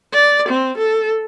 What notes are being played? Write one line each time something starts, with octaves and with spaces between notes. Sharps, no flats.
D5
C4
A4